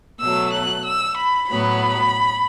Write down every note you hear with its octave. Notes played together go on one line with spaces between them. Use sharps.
B2 F#3 A3 E6
F#6
E6
B5
A2 F#3 B3 B5